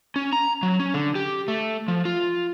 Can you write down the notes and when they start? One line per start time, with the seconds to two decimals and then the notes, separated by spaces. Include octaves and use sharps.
0.16 C#4
0.33 A#5
0.63 F#3
0.80 C#4
0.94 D3
1.15 G4
1.48 A3
1.88 F3
2.05 F4